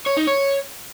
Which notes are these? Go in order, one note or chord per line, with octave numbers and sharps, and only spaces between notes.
C#5
D#4
C#5